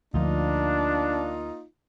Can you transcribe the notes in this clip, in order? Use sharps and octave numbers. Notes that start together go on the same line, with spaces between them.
D2 F3 A#3 D4 D#4 F4